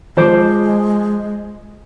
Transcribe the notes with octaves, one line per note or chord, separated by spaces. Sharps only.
F3 G#3 C5 D6